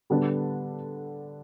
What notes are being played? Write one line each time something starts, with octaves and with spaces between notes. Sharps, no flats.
D3 G3 B3 D4